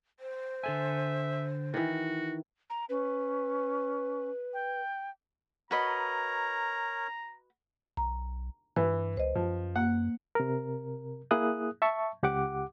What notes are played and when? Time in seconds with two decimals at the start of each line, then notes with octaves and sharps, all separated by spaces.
0.20 C5
0.64 D3 A4 E5 G#5
1.74 D#3 E3 F#4
2.70 A#5
2.89 C#4 B4
4.54 G5
5.71 F#4 A#4 B4 C#5 D#5 A#5
7.97 B1 A#5
8.76 G2 E3 B4
9.17 C#2 C5 D#5
9.35 F#2 F3
9.76 A#3 F#5
10.35 C3 A#4
11.31 A#3 E4 G#4 D#6 F#6
11.82 E5 A5 C#6
12.23 C#2 G4 F#5 D6